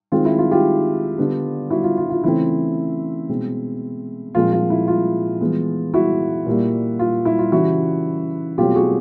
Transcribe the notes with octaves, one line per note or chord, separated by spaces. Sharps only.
D#3 G#3 C4 F4
E4
F4
F4 G4
D3 G3 B3
E4 F#4
F4
F4
F4
C#3 E3 A3 C4 E4
B2 G#3 C4
A#2 F3 G#3 C4 F4
F4
E4
F4
E3 G#3 B3
E4 F#4
A#2 G3 A#3
F4
E4
F4
C#3 E3 G3 E4 F#4
B2 F#3 A3 C4 F4 G4
F#4 G#4